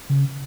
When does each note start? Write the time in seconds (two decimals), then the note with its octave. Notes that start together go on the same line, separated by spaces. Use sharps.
0.10 C#3